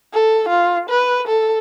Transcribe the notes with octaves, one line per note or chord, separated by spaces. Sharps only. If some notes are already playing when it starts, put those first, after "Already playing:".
A4
F4
B4
A4